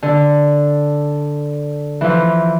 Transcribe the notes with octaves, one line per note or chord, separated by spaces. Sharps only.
D3
E3 F3